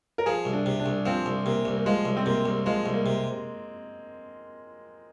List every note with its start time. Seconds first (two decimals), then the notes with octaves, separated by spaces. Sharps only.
0.18 A#4
0.26 F3 G#4
0.45 C2
0.53 D4
0.66 C3
0.80 D4
0.86 C2
1.06 F3 C4
1.26 C2
1.46 C3 A#3
1.65 C2
1.77 A#3
1.86 F3 G#3
2.05 C2
2.17 C4
2.26 C3 A#3
2.46 C2
2.66 F3 G#3
2.86 C2
2.93 A#3
3.06 C3